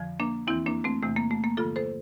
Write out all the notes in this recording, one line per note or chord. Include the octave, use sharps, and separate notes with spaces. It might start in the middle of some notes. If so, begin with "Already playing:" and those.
Already playing: F2 D3 F3
A#3 D4
E2 E3 C4 E4
A#3 D4
A3 C4
E2 C3 E3 A3
A#3
A3
A#3
G2 D3 F3 F4 A4
A4 C5